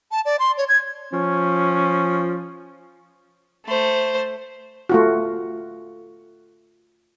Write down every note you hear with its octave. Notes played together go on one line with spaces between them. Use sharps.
A5
D5
C6
C#5
G#6
F3 C#4
A3 C5
A3 F4 F#4